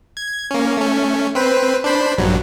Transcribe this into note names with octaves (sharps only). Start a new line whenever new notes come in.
G#6
A#3 C#4
A3 C#4
C4 B4 C5
D4 C5 B5
A#1 G2 F#3